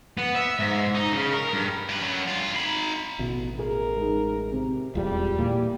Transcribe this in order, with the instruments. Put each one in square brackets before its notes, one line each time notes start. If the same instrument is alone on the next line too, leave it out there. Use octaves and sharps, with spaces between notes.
[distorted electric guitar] B3
E5
G#2
D#4
C#3
A#4
G2
G2 B4
F#2 F#3
G2 F4
D#4 B5
[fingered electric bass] A1 [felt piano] B2
[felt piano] G#4 [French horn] A#4
[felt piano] G#3 D#4
C3
[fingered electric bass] D#1 E2 [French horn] G3 [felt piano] G#3 F4
[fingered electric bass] A#2 E3 [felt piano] A#3 G4